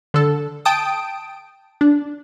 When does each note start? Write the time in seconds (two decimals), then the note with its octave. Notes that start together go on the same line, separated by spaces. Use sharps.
0.14 D3 A4
0.65 G5 A5 D#6 D7
1.81 D4